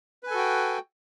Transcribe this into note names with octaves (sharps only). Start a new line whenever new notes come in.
F#4 A4 B4 G5 G#5